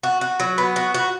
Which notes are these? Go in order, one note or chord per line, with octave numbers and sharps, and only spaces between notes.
F#4
F#4
F#3
B3
F#4
F#4